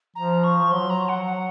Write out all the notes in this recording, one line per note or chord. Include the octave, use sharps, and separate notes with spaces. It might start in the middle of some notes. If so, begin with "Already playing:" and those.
F3 A#5
C#6
F3
F#3 C6
A#5
F#5
F#5